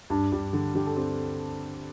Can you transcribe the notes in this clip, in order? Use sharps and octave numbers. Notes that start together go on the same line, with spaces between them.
G2 D4
G2 G4
D3
D3 G4
A4
C4 G4